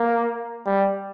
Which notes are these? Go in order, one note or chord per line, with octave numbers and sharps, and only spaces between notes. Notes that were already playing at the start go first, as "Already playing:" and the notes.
Already playing: A#3
G3